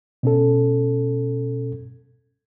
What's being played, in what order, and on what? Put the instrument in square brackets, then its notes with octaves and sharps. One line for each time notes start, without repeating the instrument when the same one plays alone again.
[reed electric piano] B2 C#4 A4